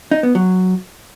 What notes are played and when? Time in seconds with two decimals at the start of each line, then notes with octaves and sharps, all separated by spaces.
0.11 D#4
0.23 B3
0.35 F#3